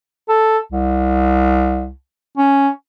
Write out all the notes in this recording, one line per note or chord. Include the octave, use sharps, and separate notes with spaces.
A4
C2
C#4